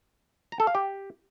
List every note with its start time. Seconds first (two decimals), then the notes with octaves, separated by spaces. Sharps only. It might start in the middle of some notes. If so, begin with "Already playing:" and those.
0.52 A#5
0.60 A4
0.67 F5
0.75 G4